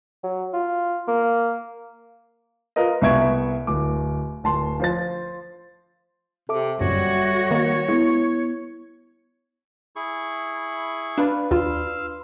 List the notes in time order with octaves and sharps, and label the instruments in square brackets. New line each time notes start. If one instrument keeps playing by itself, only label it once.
[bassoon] F#3
F4
A#3
[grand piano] F4 A#4 B4 D#5
C2 B3 E5 C#6 G#6 D7
D1 D6
D1 A5 C6
F3 C5 A6
[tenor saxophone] C3 [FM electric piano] A4 E5 D6
[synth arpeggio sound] G1 F#2 A#2 [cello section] G3 F#4 [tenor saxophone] C#5
[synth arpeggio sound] D#3 A#3
[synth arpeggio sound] G#3 [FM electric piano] B3 E4
[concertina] E4 G#4 C#6
[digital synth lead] D4 [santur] B4 F5
[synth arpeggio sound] D#2 F4 [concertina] F5 E6 [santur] C6